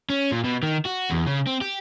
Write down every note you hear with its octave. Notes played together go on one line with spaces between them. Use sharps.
C#4
A#2
B2
D#3
F#4
E2
C#3
C4
G4